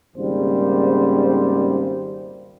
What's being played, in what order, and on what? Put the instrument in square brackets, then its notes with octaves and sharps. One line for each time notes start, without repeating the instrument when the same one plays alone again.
[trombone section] G#1 C#3 G3 A#3 C5